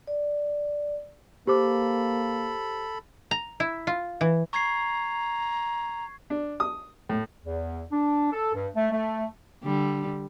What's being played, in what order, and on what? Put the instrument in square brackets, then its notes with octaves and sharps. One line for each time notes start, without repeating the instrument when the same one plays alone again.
[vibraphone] D5
[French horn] A#3 [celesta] G4 C5 D6 [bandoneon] A4 B5
[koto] A#5
E4
F4
E3
[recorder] A#5 [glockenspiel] C#6 G#6 C7
[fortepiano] D4
D#6
A2
[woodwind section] E2
D4
A4
G2
A3
A3
[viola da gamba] D3 G3